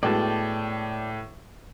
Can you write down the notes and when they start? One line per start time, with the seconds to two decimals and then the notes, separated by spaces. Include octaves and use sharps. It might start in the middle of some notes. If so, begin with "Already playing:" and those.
0.03 A2 G#3 B3 F#4 D5 G5 A5